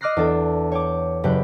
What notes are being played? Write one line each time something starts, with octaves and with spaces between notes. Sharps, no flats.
D#5 D6 F6 F#6 A#6 C7
E2 D4 A4
C#5 G5 D6
F#1 G4 B4 G5 F#6